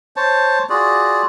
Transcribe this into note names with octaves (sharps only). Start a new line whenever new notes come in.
C5 C#5 A5
F4 F#4 G#4 D5